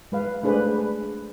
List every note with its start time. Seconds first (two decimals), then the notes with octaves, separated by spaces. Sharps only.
0.12 G#3 B4 F5
0.43 A3 D4 G#4 B4 C5 D5